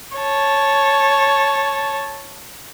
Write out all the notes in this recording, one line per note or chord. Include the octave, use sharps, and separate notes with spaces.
C#5 A5